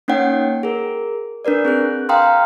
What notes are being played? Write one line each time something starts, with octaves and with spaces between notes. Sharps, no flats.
A#3 C#4 D#4 C#5 F#5 G5
G#4 A#4
D4 A#4 B4 D5
C4 G#4 F#6
F5 G5 A#5 C6 D#6 F6